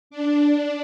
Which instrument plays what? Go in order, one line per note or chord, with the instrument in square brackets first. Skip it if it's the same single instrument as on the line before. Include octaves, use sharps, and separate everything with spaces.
[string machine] D4